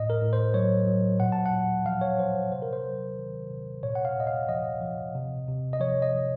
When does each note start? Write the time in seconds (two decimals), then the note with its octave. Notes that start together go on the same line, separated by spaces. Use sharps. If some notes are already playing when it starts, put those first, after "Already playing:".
Already playing: A2 D#5
0.10 A#4
0.21 A2
0.33 C5
0.54 F#3 C#5
0.87 F#3
1.20 A#2 F#5
1.32 A5
1.46 F#5
1.53 A#2
1.85 F3 F5
2.01 C#5
2.18 F3 C5
2.52 C3 C5
2.62 A#4
2.73 C5
2.84 F#3
3.18 D#3
3.50 C3
3.83 A#2 C#5
3.95 F#5
4.05 F5
4.16 A#2 D#5
4.27 F5
4.49 F3 D#5
4.81 F3
5.15 C3
5.48 C3
5.73 D#5
5.80 F3 C#5
6.02 D#5
6.13 F3